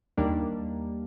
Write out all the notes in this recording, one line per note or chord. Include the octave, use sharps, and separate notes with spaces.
D#2 D#3 G3 A#3 D4